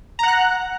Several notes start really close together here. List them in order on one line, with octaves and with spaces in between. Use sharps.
A#5 F#5 F#6